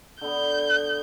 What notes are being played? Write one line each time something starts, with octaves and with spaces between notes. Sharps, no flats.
D3 B3 G6